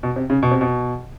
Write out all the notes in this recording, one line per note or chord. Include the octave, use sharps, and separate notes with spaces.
B2
C3
C#3
B2
C3
B2